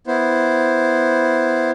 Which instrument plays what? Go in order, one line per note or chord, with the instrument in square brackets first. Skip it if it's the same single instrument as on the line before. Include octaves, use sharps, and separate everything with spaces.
[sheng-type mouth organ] B3 E4 C5